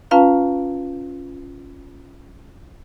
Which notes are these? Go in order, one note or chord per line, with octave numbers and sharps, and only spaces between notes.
C#4 F4 B4 F5 A5 A#5